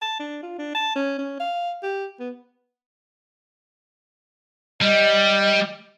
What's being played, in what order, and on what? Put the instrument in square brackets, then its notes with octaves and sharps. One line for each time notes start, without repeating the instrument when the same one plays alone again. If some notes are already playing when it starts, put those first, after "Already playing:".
[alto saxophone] A5
D4
F4
D4
A5
C#4
C#4
F5
G4
B3
[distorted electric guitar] G3 [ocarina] D#5